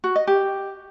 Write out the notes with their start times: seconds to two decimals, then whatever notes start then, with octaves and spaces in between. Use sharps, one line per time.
0.04 F#4
0.16 D#5
0.27 G4